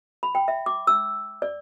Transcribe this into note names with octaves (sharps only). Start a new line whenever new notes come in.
B5
G5
E5
D6
E6
D5